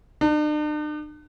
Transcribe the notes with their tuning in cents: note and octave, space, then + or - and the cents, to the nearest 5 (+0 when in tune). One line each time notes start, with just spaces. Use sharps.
D4 +45